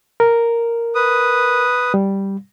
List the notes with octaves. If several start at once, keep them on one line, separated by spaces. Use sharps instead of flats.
A#4
B4 D#6
G3